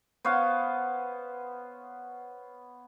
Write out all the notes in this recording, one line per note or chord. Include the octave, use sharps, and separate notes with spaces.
B3 C5 C#5 F5